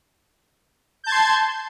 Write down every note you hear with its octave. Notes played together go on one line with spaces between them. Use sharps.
A5 C6 G6 G#6